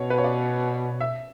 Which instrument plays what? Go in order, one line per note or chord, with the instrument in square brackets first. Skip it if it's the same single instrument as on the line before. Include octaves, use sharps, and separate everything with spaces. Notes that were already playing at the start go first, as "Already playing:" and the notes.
Already playing: [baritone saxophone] B2 [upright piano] C#5
[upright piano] B4
C#5
D5
E5